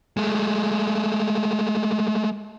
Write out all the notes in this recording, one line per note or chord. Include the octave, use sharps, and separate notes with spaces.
G#3 A3